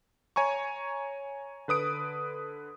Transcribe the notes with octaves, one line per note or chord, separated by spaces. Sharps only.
C#5 G#5 A#5 C#6
D3 B4 D#6 D7